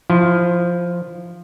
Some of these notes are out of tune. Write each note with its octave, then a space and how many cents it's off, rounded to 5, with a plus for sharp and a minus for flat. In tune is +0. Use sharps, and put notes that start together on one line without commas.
F3 +0 E4 +25